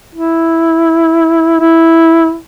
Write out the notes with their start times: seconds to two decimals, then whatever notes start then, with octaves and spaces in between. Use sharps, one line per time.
0.15 E4
1.60 E4